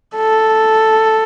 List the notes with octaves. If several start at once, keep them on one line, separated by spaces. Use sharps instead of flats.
A4